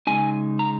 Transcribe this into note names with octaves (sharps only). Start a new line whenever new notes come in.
C#3 G#3 D#4 G#5
A#5